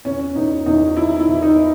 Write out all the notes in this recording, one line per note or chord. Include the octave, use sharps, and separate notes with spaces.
E2 C#4
E2 D#4
E2 D#4
D#3 E4
E4
E2
D#4